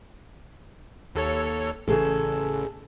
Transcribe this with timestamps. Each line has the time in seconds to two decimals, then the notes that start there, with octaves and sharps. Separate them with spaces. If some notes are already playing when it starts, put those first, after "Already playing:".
1.15 D#2 A4 C#5
1.88 A1 C#3 G#4 A4